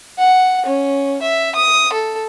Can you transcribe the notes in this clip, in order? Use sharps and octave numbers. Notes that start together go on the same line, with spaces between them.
F#5
C#4
E5
D#6
A4